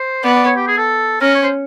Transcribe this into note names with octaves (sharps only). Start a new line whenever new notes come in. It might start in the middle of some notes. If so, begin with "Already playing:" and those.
Already playing: C5
B3 D5
D5
C#5
G4
G#4
A4
C#4 A#4
C#5
C5